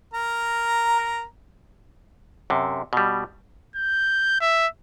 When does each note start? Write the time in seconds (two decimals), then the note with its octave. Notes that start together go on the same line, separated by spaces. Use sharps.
0.13 A#4 A#5
2.50 F#2 C3
2.93 B2 G3
3.76 G6
4.41 E5